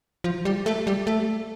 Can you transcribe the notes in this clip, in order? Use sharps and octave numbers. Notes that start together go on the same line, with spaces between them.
F3
G3
A3
G3
A3